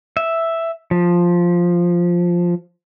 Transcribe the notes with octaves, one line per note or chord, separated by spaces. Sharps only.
E5
F3